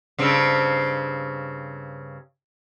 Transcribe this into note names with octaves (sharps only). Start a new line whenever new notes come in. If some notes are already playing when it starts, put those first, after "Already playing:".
G2 C#3 C4